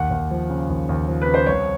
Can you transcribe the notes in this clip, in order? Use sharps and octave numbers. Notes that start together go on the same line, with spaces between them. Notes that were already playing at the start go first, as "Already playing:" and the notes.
Already playing: D#2 F#5
D#2
F3
C#3
D#2
D#2
F3
B4
C#3
C5
C2 C#5